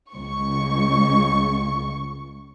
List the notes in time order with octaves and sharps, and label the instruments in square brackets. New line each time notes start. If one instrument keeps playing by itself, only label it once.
[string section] C#2 C#6